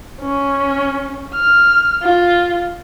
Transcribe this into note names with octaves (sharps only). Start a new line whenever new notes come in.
C#4
F6
F4